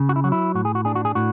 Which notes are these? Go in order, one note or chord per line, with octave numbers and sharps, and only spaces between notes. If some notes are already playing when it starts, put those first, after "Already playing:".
Already playing: C#3
F#4
E4
F#3 F#4
E4
A2 F#4
G#4
F#4
D4 G#4
F#4
G#4
A2 F#4